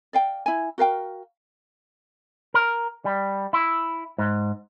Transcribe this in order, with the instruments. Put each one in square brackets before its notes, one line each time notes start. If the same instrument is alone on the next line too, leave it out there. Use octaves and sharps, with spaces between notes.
[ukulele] D5 F5 G5
E4 G#5
F#4 A#4 F5 G5
[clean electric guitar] A#4
G3
E4
G#2